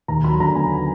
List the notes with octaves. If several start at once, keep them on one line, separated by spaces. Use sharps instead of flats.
D#2 A#5
F#3 B5
D3 A#5
B3 G#5